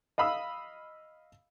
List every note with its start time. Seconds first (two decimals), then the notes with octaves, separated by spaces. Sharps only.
0.18 D#5 F5 B5 D#6 E6